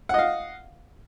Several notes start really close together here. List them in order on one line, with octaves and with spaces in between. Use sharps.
F#5 D#5 F5